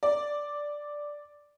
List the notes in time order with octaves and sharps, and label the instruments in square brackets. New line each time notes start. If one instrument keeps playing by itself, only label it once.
[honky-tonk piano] D5